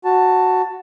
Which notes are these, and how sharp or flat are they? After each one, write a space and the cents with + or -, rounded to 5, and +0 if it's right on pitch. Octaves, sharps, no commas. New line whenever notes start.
F#4 +0 A5 +10